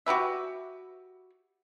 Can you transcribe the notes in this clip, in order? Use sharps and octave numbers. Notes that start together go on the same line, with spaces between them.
F#4 G4 B4 E5